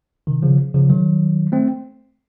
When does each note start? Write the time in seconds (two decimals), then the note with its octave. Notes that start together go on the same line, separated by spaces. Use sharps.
0.27 C3 D#3
0.42 C#3 F3
0.74 C#3 F3
0.89 D#3 F#3
1.52 A3 C4